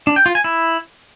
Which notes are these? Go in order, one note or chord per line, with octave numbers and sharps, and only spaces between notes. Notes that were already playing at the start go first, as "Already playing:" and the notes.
D4
G5
F4
G#5
E4